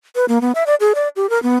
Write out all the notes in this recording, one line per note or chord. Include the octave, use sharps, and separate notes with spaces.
B4
A#3
B3
E5
D5
G#4
D5
G4
A#4
B3